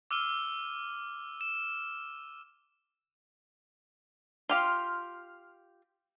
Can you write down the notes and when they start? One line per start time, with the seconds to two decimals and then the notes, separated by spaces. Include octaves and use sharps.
0.11 D6 E6 F6 D#7 G7
1.41 E7
4.49 F4 G4 F5 C6 F6